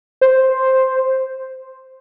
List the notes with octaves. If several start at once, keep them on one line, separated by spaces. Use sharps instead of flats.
C5